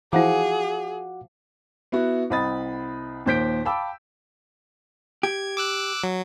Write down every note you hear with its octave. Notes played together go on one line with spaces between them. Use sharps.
E3 F3 E4 F#4 G#4 F#5 D6
B3 E4 F#4
C2 C4 D#5 B5 D#6 A6
D#2 A#2 C5 G6 B6 D7
F5 G5 A5 B5 D6 E6
G4 G#6
D6 E6 F#6
F#3